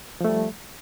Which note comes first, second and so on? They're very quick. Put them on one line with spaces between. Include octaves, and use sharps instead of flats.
F3 A3 G3